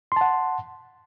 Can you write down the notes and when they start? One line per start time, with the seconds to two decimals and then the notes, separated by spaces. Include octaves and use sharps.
0.12 C6
0.16 A5
0.21 F#5